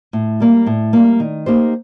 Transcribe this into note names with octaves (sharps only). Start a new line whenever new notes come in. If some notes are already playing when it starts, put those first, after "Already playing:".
A2
G3 A#3
A2
G3 A#3
D#3
A#3 D#4 G4 C5